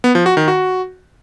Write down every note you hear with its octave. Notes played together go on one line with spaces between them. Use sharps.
B3
F3
F#4
D#3
F#4